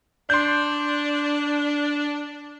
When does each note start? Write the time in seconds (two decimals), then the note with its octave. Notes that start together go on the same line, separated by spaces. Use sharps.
0.30 D4 C6 G6